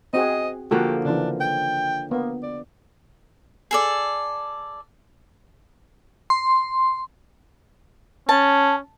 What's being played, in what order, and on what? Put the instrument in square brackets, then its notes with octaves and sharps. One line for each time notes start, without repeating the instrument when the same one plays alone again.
[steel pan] C4 F#4 G#4 [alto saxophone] D#5
[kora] D3 F3 A#3 [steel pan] F#4 [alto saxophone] G4
[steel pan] C#3 E3 [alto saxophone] D4
[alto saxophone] G5
[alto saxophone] A#3 [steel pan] B3
[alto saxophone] D5
[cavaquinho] G#4 A4 D5
[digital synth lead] C6
[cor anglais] C#4 [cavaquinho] A5